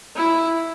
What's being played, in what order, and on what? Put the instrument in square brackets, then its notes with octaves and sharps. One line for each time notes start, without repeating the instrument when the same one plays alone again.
[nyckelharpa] E4